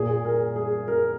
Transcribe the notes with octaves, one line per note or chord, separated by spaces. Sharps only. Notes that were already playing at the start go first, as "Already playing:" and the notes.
Already playing: A#2 G#4
A#4
G#4
A#4